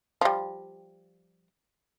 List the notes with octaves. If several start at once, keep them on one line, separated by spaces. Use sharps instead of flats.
F3 G3